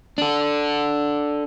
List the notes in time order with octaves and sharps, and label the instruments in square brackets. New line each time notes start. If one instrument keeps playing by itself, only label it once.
[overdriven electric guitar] D4 A4